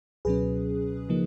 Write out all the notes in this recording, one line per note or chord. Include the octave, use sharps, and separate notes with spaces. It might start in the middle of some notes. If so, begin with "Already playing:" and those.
C#2 B2 F#3 C#4 G#4 B4
C#3 F3 A#3 D#4